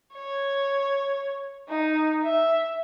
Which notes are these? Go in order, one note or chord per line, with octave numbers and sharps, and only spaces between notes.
C#5
D#4
E5